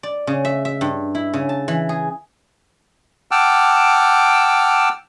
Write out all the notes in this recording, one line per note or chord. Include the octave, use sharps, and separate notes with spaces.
D5
C#3
E5
E5
G2
E4
C#3
A5
E3
G#4
F#5 G5 A5 D6 E6 F6